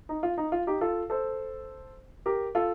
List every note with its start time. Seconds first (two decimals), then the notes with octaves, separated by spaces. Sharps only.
0.09 D#4
0.23 F4
0.38 D#4
0.52 F4
0.67 D#4 G4
0.81 F4 A4
1.10 A4 C5
2.26 G4 A#4
2.55 F4 A4